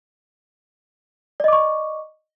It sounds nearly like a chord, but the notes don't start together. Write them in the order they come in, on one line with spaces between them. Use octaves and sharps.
D5 D#5 D6 C#6